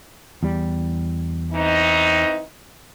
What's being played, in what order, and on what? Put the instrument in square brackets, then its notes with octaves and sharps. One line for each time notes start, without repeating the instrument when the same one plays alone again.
[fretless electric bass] E2 G3
[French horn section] E3 C4 D#4